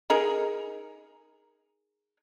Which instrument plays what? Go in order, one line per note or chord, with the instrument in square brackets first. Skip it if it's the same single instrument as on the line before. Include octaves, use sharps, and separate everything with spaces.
[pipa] D#4 G#4 A#4